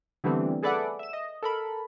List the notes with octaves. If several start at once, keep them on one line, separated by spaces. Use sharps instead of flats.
D3 E3 G3 A3 B3 C4
G#4 A4 B4 D5 E5 F#5
E5 E7
D#5
A4 A#4 B5